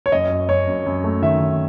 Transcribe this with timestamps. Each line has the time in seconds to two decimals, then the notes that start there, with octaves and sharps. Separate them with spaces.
0.06 C#5
0.12 F#2 D#5
0.31 F#2
0.48 F#2 C#5
0.67 F#2
0.86 F#2
1.04 A3
1.22 D#3 E5
1.40 D#3